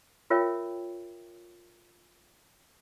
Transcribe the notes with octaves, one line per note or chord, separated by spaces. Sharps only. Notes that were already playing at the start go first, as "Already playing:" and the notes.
F4 A#4 C#5 E5 G5